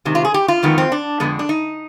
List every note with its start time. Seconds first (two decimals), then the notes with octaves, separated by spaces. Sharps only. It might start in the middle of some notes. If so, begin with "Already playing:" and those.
0.05 C3 D#3 G#3
0.15 F4
0.25 G#4
0.34 G4
0.48 F4
0.63 F2 D#3 G#3 B3
0.78 C4
0.92 D4
1.20 F2 D3 F3 G#3 B3
1.39 D4
1.49 D#4